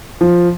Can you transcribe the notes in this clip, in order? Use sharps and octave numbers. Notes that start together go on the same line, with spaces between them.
F3